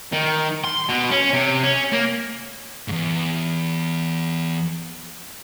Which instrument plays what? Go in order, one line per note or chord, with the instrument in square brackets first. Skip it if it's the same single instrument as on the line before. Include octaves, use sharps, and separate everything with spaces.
[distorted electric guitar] D#3
C6
B2
C#4
C3
C#4
A#3
E2 G#2